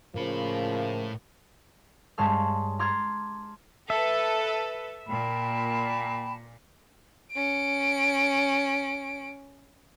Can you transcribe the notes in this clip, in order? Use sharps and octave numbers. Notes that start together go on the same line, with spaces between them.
A2 C#3 F3 A#3 B5
G2 G#3 C#5 A5 C6 F6
A#5 C6 D6 F6 G#6 A6
A4 B4 E5
A#2 G5 A5 B5
C#4 D7